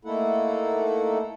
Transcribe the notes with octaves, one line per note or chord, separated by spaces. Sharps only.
A3 A#3 D#4 E4 A4 F#5